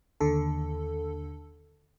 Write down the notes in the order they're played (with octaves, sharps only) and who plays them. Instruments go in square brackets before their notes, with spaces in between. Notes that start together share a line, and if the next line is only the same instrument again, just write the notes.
[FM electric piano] D#2 D3 A4